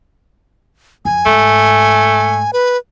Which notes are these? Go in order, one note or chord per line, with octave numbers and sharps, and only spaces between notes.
F2 G#5
G#2 A3
B4